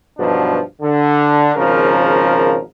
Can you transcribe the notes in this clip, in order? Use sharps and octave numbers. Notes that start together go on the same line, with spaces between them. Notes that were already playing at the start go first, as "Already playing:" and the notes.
G2 B2 F3 F#3 D4 D#4
D3
G#1 C#3 F3 A#4